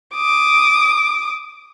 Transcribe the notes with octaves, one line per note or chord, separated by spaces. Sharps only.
D6 D#6